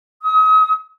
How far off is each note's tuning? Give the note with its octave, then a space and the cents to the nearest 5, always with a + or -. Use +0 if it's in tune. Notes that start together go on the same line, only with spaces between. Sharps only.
D#6 +35